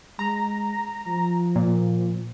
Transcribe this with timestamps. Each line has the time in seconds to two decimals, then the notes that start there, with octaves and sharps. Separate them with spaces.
0.19 G#3 A#5
1.07 F3
1.56 A#2